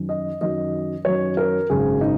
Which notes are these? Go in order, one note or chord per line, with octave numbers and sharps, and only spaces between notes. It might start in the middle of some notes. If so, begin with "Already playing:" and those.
Already playing: F#2 D#3 F#3
D#5
F#2 D#3 F#3 D#5
F#2 D#3 F#3 C#5
A#4
G#1 F#2 C#3 G#4
D#4